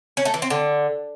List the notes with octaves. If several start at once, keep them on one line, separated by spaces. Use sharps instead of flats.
C#4
A3
E3
C4
D3